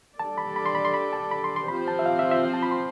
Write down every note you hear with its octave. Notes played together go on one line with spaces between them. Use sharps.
G3 D4 A4 D5 A5
B5
B5
C6
B5
C6
B5
A5
B5
C6
C6
F3 C4 G4 C5 B5
A5
E5
F5
E5
E5
A5
B5
C6